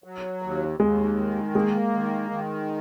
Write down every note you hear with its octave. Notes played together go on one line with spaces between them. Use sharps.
F#3
D#2
D#2 G#3
D#3
G#3 A#3
D#3
D#3